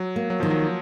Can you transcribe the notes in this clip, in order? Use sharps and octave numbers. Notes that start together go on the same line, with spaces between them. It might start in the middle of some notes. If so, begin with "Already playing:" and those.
Already playing: F#3
A#3
F#3
D#3 F3
F#3